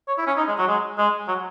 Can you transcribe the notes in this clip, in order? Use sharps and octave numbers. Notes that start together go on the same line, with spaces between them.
C#5
E4
C#4
D#4
G#3
F#3
G#3
G#3
F#3